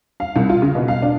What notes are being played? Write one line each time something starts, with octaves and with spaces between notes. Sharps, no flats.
F5
C2
F4
C#3
B2
F5
D4